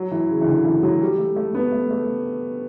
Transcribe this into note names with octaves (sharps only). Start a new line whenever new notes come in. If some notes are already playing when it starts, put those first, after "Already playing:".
Already playing: F#3
E3
C#3
E3
D3
E3
F#3
G3
A3
A3
B3
A3
A3